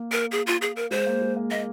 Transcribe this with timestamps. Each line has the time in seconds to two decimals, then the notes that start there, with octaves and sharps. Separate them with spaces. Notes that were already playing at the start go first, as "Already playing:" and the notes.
Already playing: A#3
0.12 A#4
0.31 G#4
0.47 F4
0.62 G#4
0.76 A#4
0.91 G#3 C5
1.06 A#3
1.21 G#3
1.36 A#3
1.51 A#3 D#5